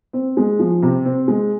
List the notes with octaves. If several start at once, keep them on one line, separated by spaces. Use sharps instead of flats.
C4
G#3
F3
C3
C4
G#3